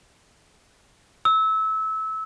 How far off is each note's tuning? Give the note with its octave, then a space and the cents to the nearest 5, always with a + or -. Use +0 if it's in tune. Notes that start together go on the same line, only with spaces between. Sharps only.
E6 -25